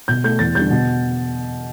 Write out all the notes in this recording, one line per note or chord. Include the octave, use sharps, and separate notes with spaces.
B2 G6
A3 G6
E2 A6
D3 G3 G6
B2